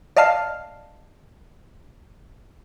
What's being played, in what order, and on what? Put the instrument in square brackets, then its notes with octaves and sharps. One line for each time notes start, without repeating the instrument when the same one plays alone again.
[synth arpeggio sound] D5 D#5 F5 A5 F6 C7